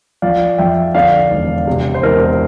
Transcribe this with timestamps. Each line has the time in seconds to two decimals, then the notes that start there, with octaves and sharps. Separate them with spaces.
0.22 F3 D5 F5
0.58 F2 E5 G5
0.95 D3 D5 F5
1.31 E1
1.67 C3
1.95 C5
2.03 E1 A#4